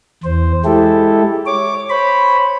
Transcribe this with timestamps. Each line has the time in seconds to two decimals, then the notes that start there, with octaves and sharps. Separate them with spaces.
0.24 E2 C5
0.65 G#3 E4 G4 A4
1.46 C#5 D6
1.90 C5 C#5 B5